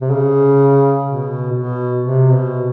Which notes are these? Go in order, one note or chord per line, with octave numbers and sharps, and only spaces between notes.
C3
C#3
B2
B2
C3
B2